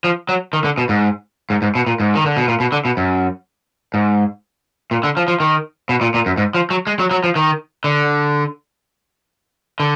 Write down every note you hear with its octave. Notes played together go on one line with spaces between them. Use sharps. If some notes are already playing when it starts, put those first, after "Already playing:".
F3
F#3
D#3
D3
B2
G#2
G#2
G#2
B2
A#2
G#2
D#3
D3
B2
A#2
B2
D3
B2
F#2
G#2
A#2
D3
F3
F3
D#3
B2
A#2
A#2
F#2
G#2
F3
F#3
G#3
F#3
F#3
F3
D#3
D3
D3